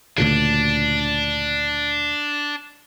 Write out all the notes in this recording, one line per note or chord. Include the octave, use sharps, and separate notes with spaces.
D2 A#2 C#3 D4